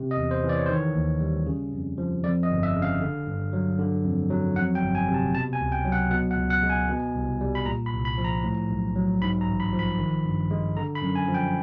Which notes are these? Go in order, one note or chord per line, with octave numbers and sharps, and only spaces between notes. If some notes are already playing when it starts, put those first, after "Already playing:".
Already playing: C3
D#5
E2
C5
E3
D5
C#5
C5
D#3 C#5
D#2
G3
C#3
F2
F3
F2 D5
D#5
G1
E5
C#3
F5
D3
G2
F#3
D3
F2
F#3
F2 F#5
G5
G1
G#5
C3
A5
B2 A5
G#5
C#2
G5
F#3
F#5
B2 F#5
F#5
C#2
F#5
G#3
G#5
B2
C2
G3
B5
A#2 A#5
B5
C2
B5
F3
A#5
A2
B1
F#3
G#2 B5
A#5
A1
B5
F3
B5
D#3
G2
G#3
D3 A#5
B5
F#2
G#5
F3
G5